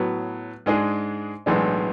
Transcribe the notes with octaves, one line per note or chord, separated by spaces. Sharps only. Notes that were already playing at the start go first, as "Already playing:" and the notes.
Already playing: A2 F#3 B3
G#2 G#3 D4 G#4
B1 A2 E3 G#3 D4